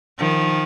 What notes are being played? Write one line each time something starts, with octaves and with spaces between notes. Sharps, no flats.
D#3 F3